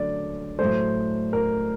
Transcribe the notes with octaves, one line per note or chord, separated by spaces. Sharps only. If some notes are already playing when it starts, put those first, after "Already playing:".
Already playing: D3 F#3 A3 D5
A2 F#3 A3 C5
A#4